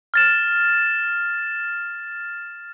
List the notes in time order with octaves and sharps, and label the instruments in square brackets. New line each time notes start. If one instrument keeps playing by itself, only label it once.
[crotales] F6 A6 E7